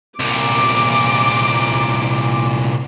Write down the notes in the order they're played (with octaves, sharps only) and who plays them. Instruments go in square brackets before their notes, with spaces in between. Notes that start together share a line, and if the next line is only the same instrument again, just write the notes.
[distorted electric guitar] C2 A#2 [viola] D6